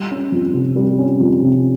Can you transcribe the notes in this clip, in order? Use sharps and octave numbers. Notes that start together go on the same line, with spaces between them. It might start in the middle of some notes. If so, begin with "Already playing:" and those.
Already playing: G3
C#4
F2
C3
G3
C#4
F2
C3